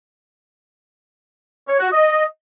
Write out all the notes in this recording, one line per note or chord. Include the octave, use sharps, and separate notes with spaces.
C#5
F#4
D#5